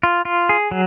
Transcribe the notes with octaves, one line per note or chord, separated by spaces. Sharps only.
F4
F4
G#4
F#3